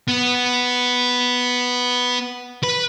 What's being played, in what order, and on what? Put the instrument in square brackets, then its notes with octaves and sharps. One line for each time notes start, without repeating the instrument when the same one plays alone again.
[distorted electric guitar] B3
B4